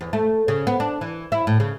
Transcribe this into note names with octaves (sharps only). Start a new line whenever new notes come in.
E2
A3
C#3
B3
D4
E3
E4
A2
C#3